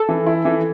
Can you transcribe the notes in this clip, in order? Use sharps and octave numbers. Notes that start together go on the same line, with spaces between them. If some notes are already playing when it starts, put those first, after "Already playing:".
Already playing: A4
E3
E4
E3